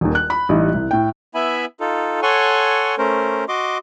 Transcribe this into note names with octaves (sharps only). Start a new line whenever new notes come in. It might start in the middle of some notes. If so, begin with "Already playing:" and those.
D#1 D#2
F#6
B5
A1 G3 D#4
C2
A2 G5
B3 E4 E5 G#5 B5
D#4 F4 A4
A4 C#5 F#5 G#5 C6 C#6
A3 C#4 A#4 C5
F#4 D#5 C6 D6